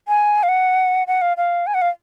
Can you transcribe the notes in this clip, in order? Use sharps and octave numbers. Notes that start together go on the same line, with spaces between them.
G#5
F5
F#5
F#5
F5
F5
G#5
F#5
F5